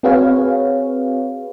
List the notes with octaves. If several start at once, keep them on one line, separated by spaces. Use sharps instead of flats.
C4 F#4 G#4 B4 C#5 F5